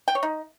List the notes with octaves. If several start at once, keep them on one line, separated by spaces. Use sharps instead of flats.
G5
C#5
D#4